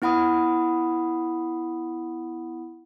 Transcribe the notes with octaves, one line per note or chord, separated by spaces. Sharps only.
B3 E4 F#5 B5 D#6